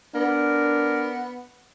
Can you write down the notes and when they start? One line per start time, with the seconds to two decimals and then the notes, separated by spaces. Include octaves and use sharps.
0.15 B3 D4 A#4